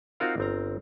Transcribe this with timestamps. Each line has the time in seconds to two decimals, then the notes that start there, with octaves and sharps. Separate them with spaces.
0.20 C4 D#4 F4 F#4 A#4 F5
0.38 G1 C4 A#5